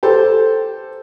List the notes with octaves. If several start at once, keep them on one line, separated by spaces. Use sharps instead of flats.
G4 A4 C5